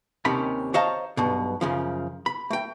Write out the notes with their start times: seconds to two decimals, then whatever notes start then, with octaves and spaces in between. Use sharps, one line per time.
0.25 D#2 C3 D#3 C#4 B5
0.74 C5 C#5 D#5 F5 A5 A#5
1.17 B1 G2 B2
1.61 F#2 C#3 F3
2.26 B5
2.50 A3 G5